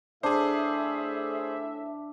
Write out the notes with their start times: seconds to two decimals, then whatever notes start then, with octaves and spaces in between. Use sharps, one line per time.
0.23 A2 D4 G#4 C5 E5